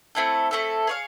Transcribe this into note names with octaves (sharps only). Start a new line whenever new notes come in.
A3 C4 E4 A4
A3 C4 E4 A4
G#4 C#5 F5